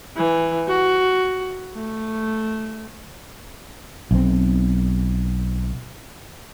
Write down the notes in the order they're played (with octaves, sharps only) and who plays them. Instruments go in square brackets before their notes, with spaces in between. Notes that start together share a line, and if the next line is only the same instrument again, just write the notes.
[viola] E3
F#4
A3
[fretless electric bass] B1 C4